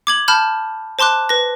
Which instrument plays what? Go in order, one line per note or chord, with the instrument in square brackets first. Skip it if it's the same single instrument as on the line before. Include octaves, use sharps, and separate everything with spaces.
[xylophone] D6 G#6 F#7
A5 B5 F6 G6
C5 A5 C6 D6 F#6
B4 A#6